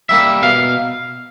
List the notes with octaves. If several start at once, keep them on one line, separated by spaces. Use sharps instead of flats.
G3 A#3 E5
B2 F5